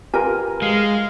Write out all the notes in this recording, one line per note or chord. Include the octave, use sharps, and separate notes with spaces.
F4 G4 A#4 B4 G#5
G#3 F5